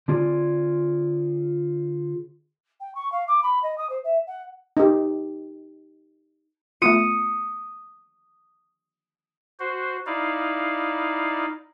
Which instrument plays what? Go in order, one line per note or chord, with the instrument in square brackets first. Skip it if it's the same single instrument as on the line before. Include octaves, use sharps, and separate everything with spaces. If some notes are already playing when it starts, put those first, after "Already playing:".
[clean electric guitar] D3 C4 F4 G#4 D5
[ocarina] G5
C#6
F5
D6
B5
D#5
D#6
C5
E5
F#5
[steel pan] D#4 G4
[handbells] A3 B3 F4 [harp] D#6 C#7 D#7
[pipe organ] F#4 C5
D#4 E4 D5 F5